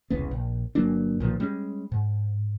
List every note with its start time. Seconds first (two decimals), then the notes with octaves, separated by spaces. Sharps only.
0.10 E1 C2 C#3 B3
0.31 A#1
0.75 G1 F#3 A#3 D4
1.20 B1 A#2 D#3 F3
1.40 G3 G#3 C#4
1.92 G#2